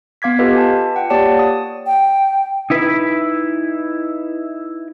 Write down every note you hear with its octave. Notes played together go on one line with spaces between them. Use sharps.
B3 F5 D6 G#6 B6
F4 G4 A4 B4 D#5
F4 G#5 A5
F#5 G5
A#3 G4 C#5 D5 A5
D#6
G5
D#4 E4 B4